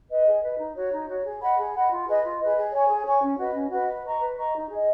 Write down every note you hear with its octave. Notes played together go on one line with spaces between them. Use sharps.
B4 D#5
G#4
B4 D#5
D#4
F#4 C#5
D#4
F#4 C#5
G#4
D#5 F#5 B5
G#4
D#5 F#5 B5
F4
G#4 B4 D#5
F4
G#4 B4 D#5
G#4
C#5 G#5 C#6
G#4
C#5 G#5 C#6
C#4
F#4 B4 D#5
C#4
F#4 B4 D#5
B4
D#5 A#5 C#6
B4
D#5 A#5 C#6
D#4
G#4 D#5